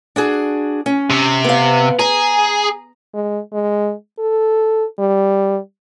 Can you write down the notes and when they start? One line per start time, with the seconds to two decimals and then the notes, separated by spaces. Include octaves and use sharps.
0.16 D4 F#4 G#4
0.86 C#4
1.10 C3
1.44 B3 F5
1.99 G#4 A#5
3.14 G#3
3.53 G#3
4.18 A4
4.99 G3